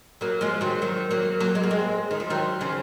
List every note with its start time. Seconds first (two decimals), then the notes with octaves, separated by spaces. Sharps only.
0.21 F#3 A#3
0.41 F3 G#3
0.61 D#3 F#3
0.82 D#3 F#3
1.11 F#3 A#3
1.40 F#3 A#3
1.55 G#3
1.63 A#3
1.71 G#3 C4
2.11 D#3
2.20 F3
2.30 D#3 F#3
2.61 C#3 F3